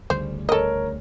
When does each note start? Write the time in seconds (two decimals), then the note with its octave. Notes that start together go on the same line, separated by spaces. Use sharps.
0.10 D2 C#3 G3 C5
0.49 A4 A#4 C#5 D#5